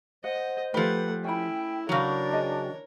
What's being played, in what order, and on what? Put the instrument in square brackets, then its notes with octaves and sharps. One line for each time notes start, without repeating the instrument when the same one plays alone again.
[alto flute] C5 [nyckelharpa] D#5 [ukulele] F#5
[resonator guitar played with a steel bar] F3 G4 [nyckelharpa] A3 F#5 [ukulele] B4
[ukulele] C#4 B5 [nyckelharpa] E4 [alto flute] G5
[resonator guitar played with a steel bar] C#3 F#3 [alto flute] D4 [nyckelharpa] A#4 C#5
[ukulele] G#4 D#5 G5